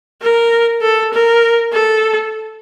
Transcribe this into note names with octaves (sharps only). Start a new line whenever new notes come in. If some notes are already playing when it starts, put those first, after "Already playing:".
A#4
A4
A#4
A4